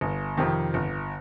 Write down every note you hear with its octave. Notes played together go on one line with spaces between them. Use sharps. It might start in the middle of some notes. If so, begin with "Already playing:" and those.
G1
F2 C3 D#3
G1